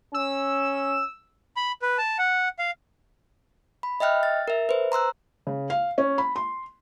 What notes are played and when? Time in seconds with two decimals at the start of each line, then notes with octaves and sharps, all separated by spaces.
0.14 C#4 E6
1.56 B5
1.82 B4
1.98 A5
2.19 F#5
2.59 F5
3.83 B5
4.00 D#5 E5 G5 F6 F#6
4.23 A6
4.48 A#4 E5
4.69 B4 C5
4.92 A#5 C6 E6 F#6
5.47 C#3
5.70 F5
5.98 C#4
6.18 B5
6.36 C6